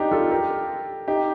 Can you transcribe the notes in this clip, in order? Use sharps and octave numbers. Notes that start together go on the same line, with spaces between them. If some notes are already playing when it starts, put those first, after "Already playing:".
Already playing: D4 D#4 G4
F4 A4
G4 A#4
D#4 G4